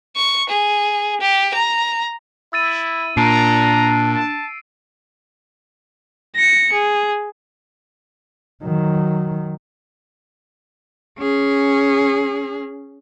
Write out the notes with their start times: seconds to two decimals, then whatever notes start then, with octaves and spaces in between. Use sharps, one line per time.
0.16 C#6
0.49 G#4
1.21 G4
1.54 A#5
2.53 E4 E6 A6 D#7
3.17 A#2 D4 A#5 C7 D7 D#7
4.08 A5
6.36 A#6 C#7
6.73 G#4
8.63 D#3 F#3
11.18 C#4 G#4